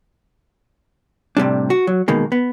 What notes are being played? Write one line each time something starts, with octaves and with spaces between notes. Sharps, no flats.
A2 C3 G3 D4
F#4
F#3
B2 D#3 G#3 A#3
B3